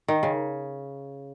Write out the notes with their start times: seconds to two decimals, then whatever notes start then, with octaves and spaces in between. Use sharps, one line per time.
0.08 D#3
0.23 C#3